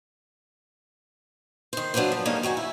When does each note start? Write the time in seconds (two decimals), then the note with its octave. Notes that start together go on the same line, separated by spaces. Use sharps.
1.73 D#3 C5
1.94 F#3 D4 F4 B4 C5
2.12 F3
2.25 G3 G#3 A#3 C#4 D#4 C#5
2.43 D#3 F#3 F#4 G#5
2.57 E4